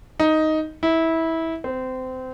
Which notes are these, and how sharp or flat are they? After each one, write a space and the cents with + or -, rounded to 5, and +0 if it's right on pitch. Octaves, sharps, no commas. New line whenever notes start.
D#4 +5
E4 -20
C4 -25